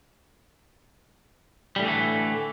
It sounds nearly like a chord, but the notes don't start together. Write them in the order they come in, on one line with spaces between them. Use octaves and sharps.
G3 A2 D3 E3 A3